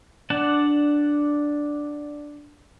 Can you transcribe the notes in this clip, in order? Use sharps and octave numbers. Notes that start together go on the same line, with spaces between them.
D4 D5 F#5 A5